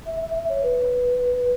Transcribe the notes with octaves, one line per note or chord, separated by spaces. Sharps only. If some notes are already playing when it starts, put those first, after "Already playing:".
E5
E5
E5
C#5
B4